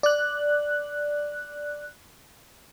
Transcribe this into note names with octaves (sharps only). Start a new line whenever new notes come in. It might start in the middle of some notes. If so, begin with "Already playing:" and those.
D5 F#6